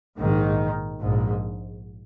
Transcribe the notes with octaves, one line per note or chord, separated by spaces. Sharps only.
A#1 G#2 D#3
A#1 G#2